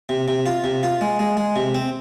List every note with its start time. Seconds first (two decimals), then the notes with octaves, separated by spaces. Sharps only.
0.09 C3
0.28 C3
0.46 F4
0.64 C3
0.83 F4
1.01 G#3
1.19 G#3
1.37 G#3
1.56 C3
1.75 C4